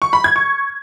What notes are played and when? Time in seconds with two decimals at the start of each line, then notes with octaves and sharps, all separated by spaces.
0.02 C#6
0.13 B5
0.24 G#6
0.36 C#6